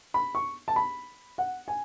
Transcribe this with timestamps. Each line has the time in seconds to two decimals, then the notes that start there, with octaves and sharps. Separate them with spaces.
0.14 B5
0.35 C#6
0.68 A5
0.76 B5
1.38 F#5
1.68 G#5